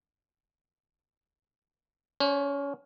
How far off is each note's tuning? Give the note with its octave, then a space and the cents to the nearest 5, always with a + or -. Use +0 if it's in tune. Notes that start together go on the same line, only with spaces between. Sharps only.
C#4 +25 C#5 -45